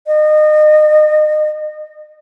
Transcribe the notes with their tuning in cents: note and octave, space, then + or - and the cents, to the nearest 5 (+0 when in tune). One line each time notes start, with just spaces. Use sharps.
D#5 -30